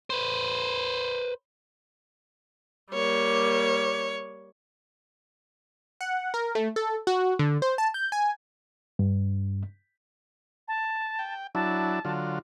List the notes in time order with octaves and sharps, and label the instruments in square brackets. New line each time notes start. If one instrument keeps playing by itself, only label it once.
[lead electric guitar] B4 C5
[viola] G3 A#3 [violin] C#5
[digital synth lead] F#5
A#4
A3
A4
F#4
D3
C5
A5
G6
G#5
[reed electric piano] G2
[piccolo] A5
[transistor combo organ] G5
[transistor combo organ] F#3 D4 E4 [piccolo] A5
[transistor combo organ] D3 F#3 F4